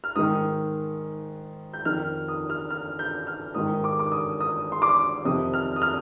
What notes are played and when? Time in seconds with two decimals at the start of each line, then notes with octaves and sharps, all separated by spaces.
0.04 F6
0.16 G#2 D#3 D#6
1.73 G6
1.85 F2 D#3 F6
2.28 D#6
2.50 F6
2.70 F6
2.99 G6
3.27 F6
3.55 G#2 D#3 D#6
3.84 D6
3.99 D6
4.12 D#6
4.40 D#6
4.72 C6
4.82 D6
5.25 F2 C3 D#3 D#6
5.54 F6
5.76 D#6
5.82 F6